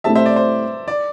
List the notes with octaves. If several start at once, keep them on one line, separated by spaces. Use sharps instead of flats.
A2 A3 C4 E4 G4 E5 A5
C5 E5
D5
C5
D5